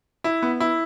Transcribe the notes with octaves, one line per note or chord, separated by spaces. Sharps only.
E4
B3
E4